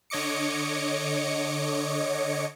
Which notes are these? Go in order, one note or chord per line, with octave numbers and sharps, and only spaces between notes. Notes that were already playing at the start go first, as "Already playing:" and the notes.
D3 C#5 D#5 D6 C#7